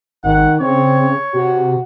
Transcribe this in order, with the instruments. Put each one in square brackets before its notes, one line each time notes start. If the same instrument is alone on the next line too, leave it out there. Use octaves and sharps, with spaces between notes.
[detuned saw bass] G#1 [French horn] D#3 [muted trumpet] F#5
[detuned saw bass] C#3 [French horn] C4 [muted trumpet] C#5
[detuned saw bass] C3 [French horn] F#4